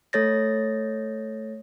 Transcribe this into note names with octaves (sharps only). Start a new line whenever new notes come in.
A3 A4 C#5 A6 A#6